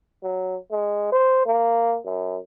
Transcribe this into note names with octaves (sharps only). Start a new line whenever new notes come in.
F#3
G#3
C5
A#3
F#2